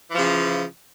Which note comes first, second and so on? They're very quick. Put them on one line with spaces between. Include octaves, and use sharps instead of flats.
E3 F3 C#3